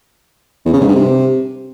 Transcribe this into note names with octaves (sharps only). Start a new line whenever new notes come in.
E2
C#3
G#2
G2
C3